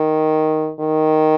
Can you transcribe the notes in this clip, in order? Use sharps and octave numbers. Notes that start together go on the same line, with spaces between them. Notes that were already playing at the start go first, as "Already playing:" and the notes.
Already playing: D#3
D#3